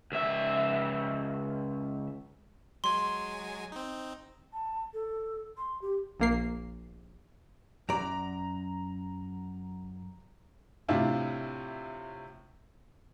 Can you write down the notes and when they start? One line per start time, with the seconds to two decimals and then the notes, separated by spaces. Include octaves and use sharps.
0.12 C#2 E5
2.84 F#3 G#3 G#5 C6
3.72 C4 D#4
4.53 A5
4.94 A4
5.57 C6
5.82 G4
6.20 A#1 A#3 C7
7.89 F#2 D5 A#5
10.88 A2 C3 D4 E4 F4